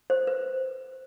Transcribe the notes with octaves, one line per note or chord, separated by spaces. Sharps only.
C5
B4